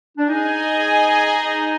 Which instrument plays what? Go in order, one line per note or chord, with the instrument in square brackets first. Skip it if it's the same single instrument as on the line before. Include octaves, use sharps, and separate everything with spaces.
[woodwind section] D4
[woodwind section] D#4 [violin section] G#4 D#5 G#5